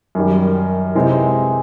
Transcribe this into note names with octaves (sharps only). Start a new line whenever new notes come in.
F#2 D#3 G3
C3 E3 G#3 C4 D#4